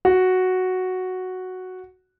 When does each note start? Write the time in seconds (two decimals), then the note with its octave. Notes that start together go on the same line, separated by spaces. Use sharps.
0.05 F#4